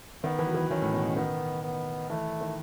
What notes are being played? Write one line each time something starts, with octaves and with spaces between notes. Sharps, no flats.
D#3 B3
E3
F#3
E3
D#3 C#4
A2
B2
C#3
D#3 B3
B3
E3 A3
D#3